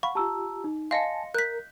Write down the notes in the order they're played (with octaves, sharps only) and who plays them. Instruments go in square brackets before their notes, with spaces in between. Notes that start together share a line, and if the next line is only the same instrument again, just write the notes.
[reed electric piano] F5 B5 [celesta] F#5 [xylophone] C#6
[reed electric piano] F4 G4 [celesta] A5 A#5 E6
[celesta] D#4
[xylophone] D#5 F5 [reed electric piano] G#5 A5 [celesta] C6 A#6 C#7
[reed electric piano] A#4 [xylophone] F#6 B6 [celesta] G6